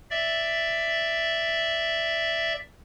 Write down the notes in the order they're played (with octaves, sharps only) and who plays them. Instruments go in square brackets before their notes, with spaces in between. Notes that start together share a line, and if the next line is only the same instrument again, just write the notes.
[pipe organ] D5 E5